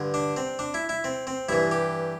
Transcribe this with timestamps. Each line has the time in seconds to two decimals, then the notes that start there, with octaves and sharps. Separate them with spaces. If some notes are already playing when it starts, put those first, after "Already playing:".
Already playing: G2 D3
0.14 D4
0.37 C4
0.59 D4
0.74 E4
0.89 E4
1.04 C4
1.27 C4
1.49 G2 E3 E4
1.71 G4